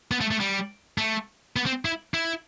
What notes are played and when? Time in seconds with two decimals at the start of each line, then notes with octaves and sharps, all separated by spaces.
0.11 B3
0.21 A3
0.31 A3
0.40 G3
0.98 A3
1.56 B3
1.66 C4
1.85 E4
2.14 E4